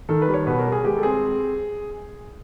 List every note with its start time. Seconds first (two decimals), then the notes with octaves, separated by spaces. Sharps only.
0.09 D#3 A4
0.22 B4
0.28 G3
0.34 C#5
0.47 B2 B4
0.59 A#4
0.65 G3
0.72 G#4
0.84 G#3 G4
0.97 A4
1.03 C4 G#4